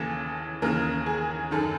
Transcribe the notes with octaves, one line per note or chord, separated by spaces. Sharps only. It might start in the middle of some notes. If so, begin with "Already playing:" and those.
Already playing: D#2 C#3 E3 A4
D#2 C#3 E3 A#4
G#4
F#2 D#3 A4